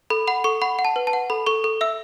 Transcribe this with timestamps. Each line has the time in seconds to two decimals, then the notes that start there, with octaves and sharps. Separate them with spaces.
0.10 A4 B5
0.27 F#5 B5
0.44 A4 C#6
0.62 F#5 B5
0.79 F#5
0.85 A5
0.96 B4
1.07 A5
1.13 F#5
1.30 A4 B5
1.46 A4 C#6
1.64 A4
1.81 E5 E6